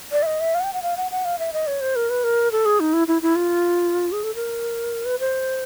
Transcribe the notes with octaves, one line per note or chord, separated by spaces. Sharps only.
D5
E5
D#5
E5
F5
F#5
G5
F#5
F5
F#5
F#5
F5
E5
D#5
C#5
C5
A#4
B4
A#4
A4
G#4
D#4
E4
E4
E4
F4
G#4
A4
A#4
B4
C5